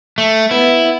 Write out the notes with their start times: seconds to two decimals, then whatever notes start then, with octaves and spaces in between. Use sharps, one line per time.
0.18 A3
0.51 B3 E4